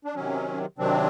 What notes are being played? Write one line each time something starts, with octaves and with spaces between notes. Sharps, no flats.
D4
C3 D#3 F#3 C#4
C3 D#3 F#3 C4 D4